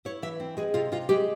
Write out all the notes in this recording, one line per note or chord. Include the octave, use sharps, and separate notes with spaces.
E4 C#5
E3 E5
C4
G#3 G#4
C3 F4
C3 F4
G#3 G4